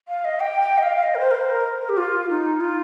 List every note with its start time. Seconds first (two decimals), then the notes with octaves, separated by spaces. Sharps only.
0.08 F5
0.25 D#5
0.40 G5
0.61 G5
0.78 D#5
0.83 F5
0.97 F5
1.03 D#5
1.15 A#4
1.19 C5
1.31 A#4
1.35 C5
1.50 A#4
1.81 A#4
1.89 G4
1.97 F4
2.30 D#4
2.60 F4